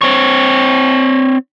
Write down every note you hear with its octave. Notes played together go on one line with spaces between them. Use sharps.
C4 C#5